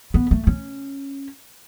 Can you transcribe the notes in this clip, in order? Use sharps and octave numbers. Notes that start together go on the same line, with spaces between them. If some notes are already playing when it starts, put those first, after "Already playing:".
B3
A3
C#4